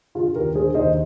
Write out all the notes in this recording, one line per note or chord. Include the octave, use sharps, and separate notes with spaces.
D3 F4 G#4
D#2 G4 A#4
D3 G#4 C5
D#2 C5 D#5